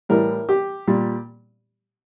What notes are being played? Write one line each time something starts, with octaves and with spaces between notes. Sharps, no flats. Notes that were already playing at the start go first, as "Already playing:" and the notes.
A2 E3 G3 A#4
G4
A#2 G3